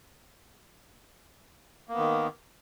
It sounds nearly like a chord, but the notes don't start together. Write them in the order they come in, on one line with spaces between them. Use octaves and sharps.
A#3 B3 D#3